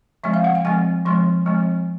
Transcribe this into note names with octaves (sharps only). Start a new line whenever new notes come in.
F3 G#3 C4 E5
F5
F#5
G5
F3 G#3 C4 G#5
F3 G#3 C4 C6
F3 G#3 C4